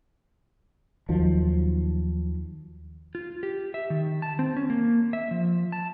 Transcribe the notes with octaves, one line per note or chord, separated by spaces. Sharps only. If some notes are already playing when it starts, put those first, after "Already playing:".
D#2 D#3 F3 F#3
F4
G4
E5
D#3
A5
C4
C#4
A#3
E5
F3
A5